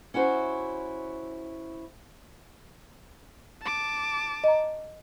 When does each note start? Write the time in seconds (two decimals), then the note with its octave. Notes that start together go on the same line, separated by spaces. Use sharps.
0.14 C#4 E4 F#4 C5
3.62 A5 D6
4.44 D#5 A#5